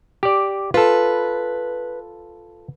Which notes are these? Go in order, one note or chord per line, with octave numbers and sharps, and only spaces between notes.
G4 D5
F4 A4 B4